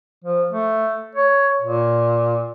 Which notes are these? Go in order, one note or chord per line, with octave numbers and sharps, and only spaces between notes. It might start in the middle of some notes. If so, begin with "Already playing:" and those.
F3
A3
C#5
A#2